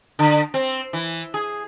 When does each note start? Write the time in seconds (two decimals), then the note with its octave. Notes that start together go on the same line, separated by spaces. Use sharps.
0.19 D3
0.54 C4
0.93 E3
1.34 G#4